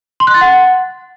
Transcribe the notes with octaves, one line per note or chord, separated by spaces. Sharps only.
C6
F#6
A6
F#5